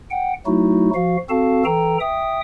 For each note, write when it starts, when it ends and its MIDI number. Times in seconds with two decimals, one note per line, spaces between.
0.11 0.33 78
0.11 0.33 79
0.46 0.90 54
0.46 0.90 57
0.46 0.90 63
0.46 0.90 64
0.46 0.90 66
0.95 1.17 53
0.95 1.17 66
0.95 1.17 77
1.29 1.64 60
1.29 1.64 66
1.29 1.64 69
1.29 1.64 77
1.29 1.64 81
1.65 1.98 52
1.65 1.98 69
1.65 1.98 79
1.65 1.98 82
2.00 2.41 76
2.00 2.41 79
2.00 2.41 87